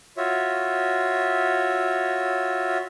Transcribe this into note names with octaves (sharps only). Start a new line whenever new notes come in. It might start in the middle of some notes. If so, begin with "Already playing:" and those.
F4 F#4 C#5 E5